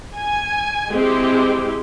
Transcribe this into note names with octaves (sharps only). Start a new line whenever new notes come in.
G#5
G#3 C4 E4 G4